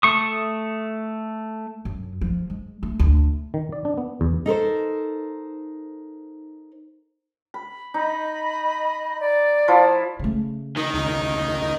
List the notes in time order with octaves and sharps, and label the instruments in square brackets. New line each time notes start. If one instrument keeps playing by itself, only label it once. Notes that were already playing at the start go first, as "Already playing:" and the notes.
[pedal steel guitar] A3 C#6 D#6
[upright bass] F#2
F3
G#3
A3
D2
[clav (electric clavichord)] D#3
D5
D4
B3
E2
[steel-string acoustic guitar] D#4 A4 A#4 C5
[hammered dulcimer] B5
[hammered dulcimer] D#4 [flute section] D#5 B5
[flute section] D5
[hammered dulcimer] F3 E4
[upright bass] C#3 A3
[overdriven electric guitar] D#3 [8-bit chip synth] D#4
[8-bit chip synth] C#2 D#4